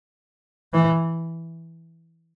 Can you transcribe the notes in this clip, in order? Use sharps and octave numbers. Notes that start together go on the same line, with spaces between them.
E3